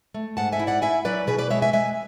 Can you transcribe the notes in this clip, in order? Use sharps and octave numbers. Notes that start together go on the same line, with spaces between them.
A3
G#2 F#5 A5
E5 G#5
E4
D5 F#5
E4 E5 G#5
F#3 B4 D5
B2 G#4 B4
B4 D5
G#3 C#5 E5
E5 G#5
G#3 E5 G#5